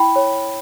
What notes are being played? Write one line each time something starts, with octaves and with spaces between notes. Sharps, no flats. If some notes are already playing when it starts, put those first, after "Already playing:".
Already playing: E4 G5 B5
C#5